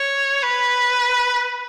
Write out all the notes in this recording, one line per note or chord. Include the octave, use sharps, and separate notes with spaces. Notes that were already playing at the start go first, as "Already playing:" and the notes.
Already playing: C#5
B4